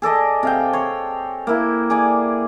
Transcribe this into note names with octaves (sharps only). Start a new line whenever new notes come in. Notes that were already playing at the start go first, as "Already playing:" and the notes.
G#4 A4 D5 D#5
C3 F5 G5
C#5 C6
A#3 E4
G#4 D5 G#5